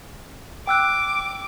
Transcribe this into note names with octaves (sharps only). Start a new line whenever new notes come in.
G5 D6 E6 F#6